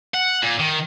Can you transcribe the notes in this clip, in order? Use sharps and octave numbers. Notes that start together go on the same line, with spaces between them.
F#5
A#2
D#3